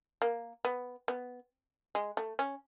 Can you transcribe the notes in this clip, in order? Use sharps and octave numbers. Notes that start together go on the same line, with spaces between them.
A#3
B3
B3
G#3
A3
C#4